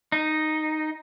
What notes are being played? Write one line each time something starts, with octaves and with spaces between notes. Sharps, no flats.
D#4